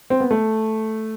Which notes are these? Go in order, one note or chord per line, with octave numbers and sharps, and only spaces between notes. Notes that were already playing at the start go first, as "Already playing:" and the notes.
C4
B3
A3